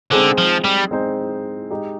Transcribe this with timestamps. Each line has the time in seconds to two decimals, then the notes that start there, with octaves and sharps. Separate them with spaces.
0.11 D3 G#3 C4 D#4 G#4 C5
0.38 F3
0.64 G3
0.91 G#3 C4 D#4 G#4 C5
1.71 G#3 D#4 G4